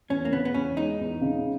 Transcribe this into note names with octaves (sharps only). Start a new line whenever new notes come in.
E2 C#4
A#3
C#3 B3
B3
E2 C#4
G#3 D#4
E2
C#3